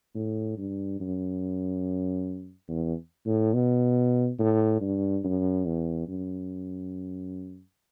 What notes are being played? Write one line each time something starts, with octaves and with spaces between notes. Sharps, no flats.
A2
G2
F#2
E2
A2
B2
A2
G2
F#2
E2
F#2